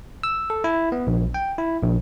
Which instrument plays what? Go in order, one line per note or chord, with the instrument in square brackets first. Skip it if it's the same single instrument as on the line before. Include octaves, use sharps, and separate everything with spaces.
[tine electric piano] E6
A4
E4
B3
A#1
G5
E4
A#1